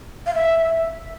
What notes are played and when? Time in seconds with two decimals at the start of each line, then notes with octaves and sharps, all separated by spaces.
0.26 F5
0.34 E5